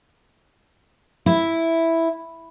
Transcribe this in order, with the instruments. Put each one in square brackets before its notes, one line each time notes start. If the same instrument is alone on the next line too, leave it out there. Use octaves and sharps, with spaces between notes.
[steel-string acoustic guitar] E4